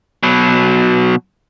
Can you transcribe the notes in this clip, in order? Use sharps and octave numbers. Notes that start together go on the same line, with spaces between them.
B2 F#3